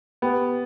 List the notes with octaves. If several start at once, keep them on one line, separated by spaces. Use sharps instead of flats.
B3 G4 B4 G5